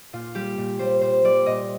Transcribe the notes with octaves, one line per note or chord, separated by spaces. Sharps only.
A#2 F4
G3 G4
A#2
G3 C5
A#2 C5
G3 D5
A#2 D#5